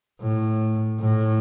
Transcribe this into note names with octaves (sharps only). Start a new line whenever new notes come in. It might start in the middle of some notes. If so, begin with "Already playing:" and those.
A2
A2